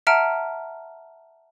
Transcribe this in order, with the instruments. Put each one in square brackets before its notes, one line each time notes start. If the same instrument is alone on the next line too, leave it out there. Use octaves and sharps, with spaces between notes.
[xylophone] E5 F#5 A5 A#5 F6 D7